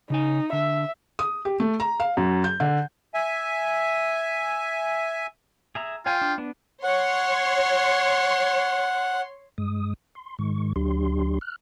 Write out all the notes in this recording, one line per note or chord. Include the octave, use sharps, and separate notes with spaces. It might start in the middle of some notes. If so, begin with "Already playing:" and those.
C#3 D#4 G#5
D3 E5
D#6
G4
A3
A#5
F5
F#2
G6
D3
E5 G#5
G#4 E5 A#5
F4 C#5 F5 G5 G#5
D4
B3 D4
C#5 F#5 C6
G2 G#3 D#6
C6
G#2 D#3 G#3 C#6
D2 F#3 D4 G4 C6
F6 F#6